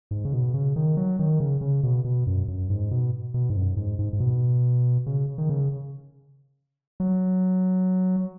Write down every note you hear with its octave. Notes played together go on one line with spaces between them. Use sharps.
G#2
C#3
B2
C#3
D#3
F#3
D#3
C#3
C#3
B2
B2
F#2
F#2
G#2
B2
B2
G#2
F#2
G#2
G#2
G#2
B2
C#3
D#3
C#3
F#3